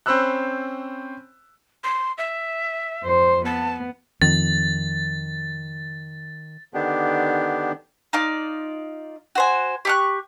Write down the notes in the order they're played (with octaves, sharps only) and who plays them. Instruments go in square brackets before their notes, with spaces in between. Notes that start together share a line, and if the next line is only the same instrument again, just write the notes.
[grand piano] C4 C#4 C5 B5 E6 F#6
[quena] C6
E5
[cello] F2 C5
[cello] B3 [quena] A5
[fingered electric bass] F2 [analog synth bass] D#3 [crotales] A6
[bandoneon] D3 D#3 B3 D4 G4
[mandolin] D#4 F4 D5
F#4 C5 G#5
G4 C#6 F#6